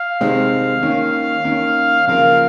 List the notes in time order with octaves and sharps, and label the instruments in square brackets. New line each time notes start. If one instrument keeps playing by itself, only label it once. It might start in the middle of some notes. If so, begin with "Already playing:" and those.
Already playing: [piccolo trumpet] F5
[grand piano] C3 D#3 G#3 C4
D#3 A#3 C#4
D#3 A#3 C#4
[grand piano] C#3 F3 A#3 F4 A#4 [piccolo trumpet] F5